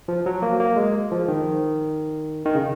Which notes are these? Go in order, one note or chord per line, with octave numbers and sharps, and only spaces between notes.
F3
F#3
A#3
A#3
G#3
F3
D#3
D#3
C#3